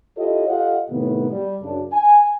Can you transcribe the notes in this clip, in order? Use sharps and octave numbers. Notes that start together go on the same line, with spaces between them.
E4 F4 G4 A4 C#5 D#5
F4 G4 A4 D#5 F5 F#5
A2 C3 D#3 B3
G3
F#2 C#3 D4
G#5